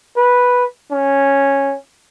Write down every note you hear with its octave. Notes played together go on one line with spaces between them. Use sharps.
B4
C#4